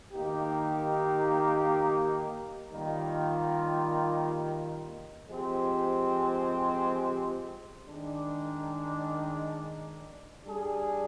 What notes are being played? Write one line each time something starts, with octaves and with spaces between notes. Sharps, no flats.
D#3 A#3 D#4 G4
D#3 G3 A#3 F4
F3 G#3 C4 G4
D#3 G#3 D4
G3 D4 G#4